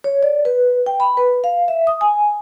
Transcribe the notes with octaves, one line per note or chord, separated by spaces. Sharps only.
C#5
D5
B4
G5
B5
B4
F5
E5
D#6
G#5